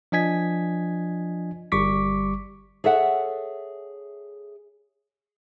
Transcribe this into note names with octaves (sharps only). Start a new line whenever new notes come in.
F3 D4 D#5 G#5 G#6 B6
G1 G3 C#6 D6 B6
G#4 A4 C#5 E5 F#5